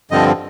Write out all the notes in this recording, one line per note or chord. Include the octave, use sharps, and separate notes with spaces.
G2 D3 F3 C4 D#5